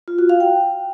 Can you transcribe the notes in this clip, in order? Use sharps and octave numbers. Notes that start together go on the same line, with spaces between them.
F4
F#4
F5
G5